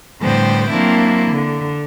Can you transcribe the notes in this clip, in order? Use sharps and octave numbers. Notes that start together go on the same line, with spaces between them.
A2 D3 G3 B3 C5 G5
F#3 A#3 C4 D4 E4
D3